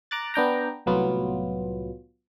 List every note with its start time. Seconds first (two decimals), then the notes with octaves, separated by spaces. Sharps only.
0.11 A#5 D6 F#6 A6
0.34 B3 D4 G5 A#5
0.86 C2 A2 F#3 B3 F4